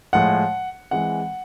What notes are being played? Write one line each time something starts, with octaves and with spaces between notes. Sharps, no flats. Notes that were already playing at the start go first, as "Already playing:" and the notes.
A2 F3 G#3 F#5
E3 G#3 C4 F#5